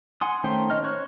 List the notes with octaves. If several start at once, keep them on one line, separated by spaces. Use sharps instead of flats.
F#5 G#5 C6 D#6
D#3 A3 C#4 C5 G5
C#4 D#5 F6
C5 C#5 C#6 F#6